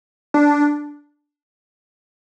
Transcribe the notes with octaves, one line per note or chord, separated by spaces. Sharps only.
D4